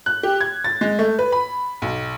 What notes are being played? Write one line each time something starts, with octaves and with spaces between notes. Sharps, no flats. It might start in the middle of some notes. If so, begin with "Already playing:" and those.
F#6
G4
G#6
A6
G#3
A3
B4
B5
B1